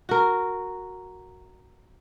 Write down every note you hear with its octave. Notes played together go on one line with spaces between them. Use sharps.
F#4 A#4